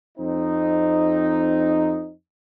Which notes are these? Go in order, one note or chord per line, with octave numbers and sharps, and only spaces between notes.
F2 C4 D#4